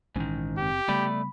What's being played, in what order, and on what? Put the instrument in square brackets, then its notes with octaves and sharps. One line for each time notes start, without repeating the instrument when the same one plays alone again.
[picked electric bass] A#1 E3 C#4 [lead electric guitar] G#2 D#3
[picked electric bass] F#1 C4 [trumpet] G4
[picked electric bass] C#3 G3 B3 [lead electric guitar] A3 D5 [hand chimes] B5